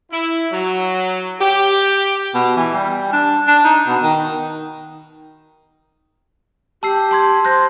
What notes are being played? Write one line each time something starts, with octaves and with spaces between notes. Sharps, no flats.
E4
F#3
G4
B2
E3
G3
D4
D4
D#4
B2
D#3
G4 A5 E6 C7
A5 C6 G#6
C5 F#6 G6 A#6